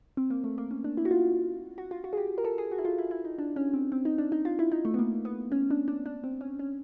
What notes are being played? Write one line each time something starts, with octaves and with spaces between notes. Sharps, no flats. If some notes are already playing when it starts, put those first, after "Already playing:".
C4
A#3
A3
A#3
C#4
D4
E4
F#4
F4
F#4
F4
F#4
G#4
G4
A#4
A4
G#4
F#4
E4
F4
E4
E4
D#4
D4
C#4
C4
C4
D#4
D4
D#4
F4
E4
D#4
A3
B3
A#3
B3
C#4
D4
D4
D4
C4
C#4
C#4